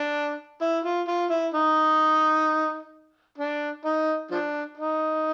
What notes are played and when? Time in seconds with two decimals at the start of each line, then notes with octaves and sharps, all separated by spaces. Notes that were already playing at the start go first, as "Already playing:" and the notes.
Already playing: D4
0.61 E4
0.84 F4
1.08 F4
1.30 E4
1.54 D#4
3.38 D4
3.85 D#4
4.31 F3 D4
4.77 D#4